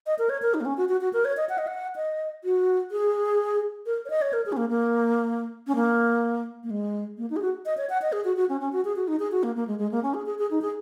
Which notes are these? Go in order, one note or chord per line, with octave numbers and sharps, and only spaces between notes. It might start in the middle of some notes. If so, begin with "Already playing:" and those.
D#5
A#4
C#5
A#4
D#4
A#3
C#4
F#4
F#4
F#4
A#4
C#5
D#5
F#5
D#5
F#5
D#5
F#4
G#4
A#4
C#5
D#5
C#5
A#4
G#4
C#4
A#3
A#3
C#4
A#3
A#3
G#3
A#3
D#4
G#4
F#4
D#5
C#5
F#5
D#5
G#4
F#4
F#4
C#4
C#4
F#4
G#4
F#4
D#4
G#4
F#4
A#3
A#3
G#3
G#3
A#3
C#4
G#4
G#4
G#4
D#4
G#4